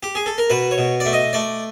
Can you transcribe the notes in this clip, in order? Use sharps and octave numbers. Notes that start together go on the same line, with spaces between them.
G4
G#4
A4
A#4
B2 B4
C#5
B2
D5
A3
D#5
A3 D5